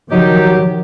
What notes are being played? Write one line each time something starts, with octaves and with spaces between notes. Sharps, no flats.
D#3 F3 F#3 D#4 G4